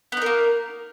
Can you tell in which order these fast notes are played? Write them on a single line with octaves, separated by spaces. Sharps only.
B3 D#4 A#4 A#3